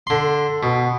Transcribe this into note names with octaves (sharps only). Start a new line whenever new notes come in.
D3 C6
B2